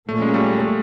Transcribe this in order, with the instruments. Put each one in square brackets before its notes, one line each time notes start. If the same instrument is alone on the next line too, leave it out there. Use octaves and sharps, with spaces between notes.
[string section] A#2 F3 A#3 C#4 [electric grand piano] A3
[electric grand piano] G#3
G3 A3
A3